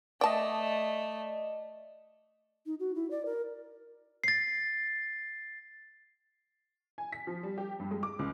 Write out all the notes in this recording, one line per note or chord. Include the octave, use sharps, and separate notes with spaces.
A3 D5 D#5 G5 A5
D#4
F#4
E4
D5
A#4
A6 C7
G#5
B6
F3
G3
G4
G2
G#3
D6
C#2